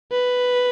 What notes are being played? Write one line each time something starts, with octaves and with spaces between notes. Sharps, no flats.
B4